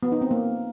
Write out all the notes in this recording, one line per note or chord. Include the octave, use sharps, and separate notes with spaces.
B3
D#4
C4
A#3